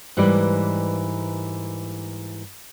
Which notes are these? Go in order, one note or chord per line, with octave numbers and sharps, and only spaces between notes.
G#2 E3 G3 A#3 B4 D5